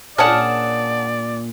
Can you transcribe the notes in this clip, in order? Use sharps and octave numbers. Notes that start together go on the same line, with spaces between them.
A#2 C#4 D4 G#4 D5 F#5 A5 F6